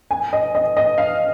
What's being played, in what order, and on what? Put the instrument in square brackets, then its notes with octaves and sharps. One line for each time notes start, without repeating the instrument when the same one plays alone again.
[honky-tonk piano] G#5
D#5
D#5
D#5
F5